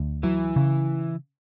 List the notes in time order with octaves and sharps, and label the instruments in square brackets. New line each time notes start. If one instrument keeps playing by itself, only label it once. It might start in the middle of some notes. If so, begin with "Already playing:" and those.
Already playing: [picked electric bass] D2
[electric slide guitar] E3 E4 [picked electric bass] F#3
[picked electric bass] C#3